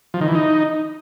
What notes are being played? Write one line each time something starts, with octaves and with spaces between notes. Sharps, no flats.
F3
D#3
E3
D#4